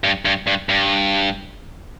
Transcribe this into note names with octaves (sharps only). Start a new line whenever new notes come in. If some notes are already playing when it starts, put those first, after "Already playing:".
G2
G2
G2
G2